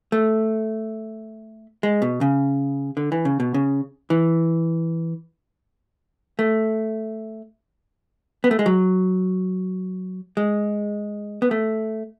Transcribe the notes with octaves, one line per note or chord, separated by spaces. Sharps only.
A3
G#3
B2
C#3
D3
E3
C#3
B2
C#3
E3
A3
B3
A3
G#3
F#3
G#3
B3
A3